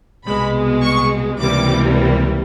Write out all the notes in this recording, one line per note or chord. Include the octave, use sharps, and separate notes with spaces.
C2 B2 G#3 B5
C#6
C#2 C3 E3 G3 A#3 D6